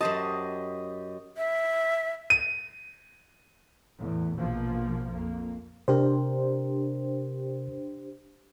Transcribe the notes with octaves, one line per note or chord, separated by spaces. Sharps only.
F#2 G4 C5 D#5 A5
E5
D#7
E2 A2
A#1 B2 F3 A#3
F2 A#3
C3 D4 G4 A#4 C5